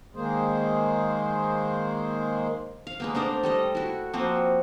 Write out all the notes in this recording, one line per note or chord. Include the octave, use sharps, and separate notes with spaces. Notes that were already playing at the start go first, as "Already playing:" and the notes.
D#3 G#3 A#3 G#4 C5
F5
G#3 A#3 B3
A3 D4 A#4 C5
G3 A4 D#5
E4 F#4
F3 A#3 C4 F#4